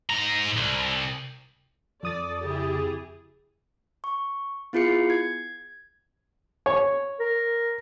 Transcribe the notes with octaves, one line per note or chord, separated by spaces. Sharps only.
G#2 A#5
C2
F2 A4 D5 D#6 A6
C#3 E4 G4 G#4
C#6
B3 E4 F4 G#4 C7 C#7
G#6
C#5
A#4